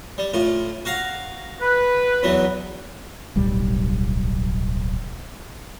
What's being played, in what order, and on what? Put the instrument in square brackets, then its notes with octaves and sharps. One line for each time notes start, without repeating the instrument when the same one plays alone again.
[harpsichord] G3
A2 F4
F#4 F5 A#5
[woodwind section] B4
[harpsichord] E2 E3 F#3
[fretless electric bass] D1 B1 G3